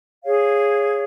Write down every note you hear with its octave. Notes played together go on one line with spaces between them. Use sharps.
G#4 C#5 F5